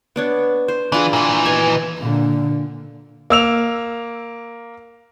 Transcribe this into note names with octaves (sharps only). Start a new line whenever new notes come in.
B3 D4 C#5
C5
E3 D4 F4 G#4
A#2 E3 G5 C6
B2 D#5 G#5
A#2 D3
A#3 E6 F7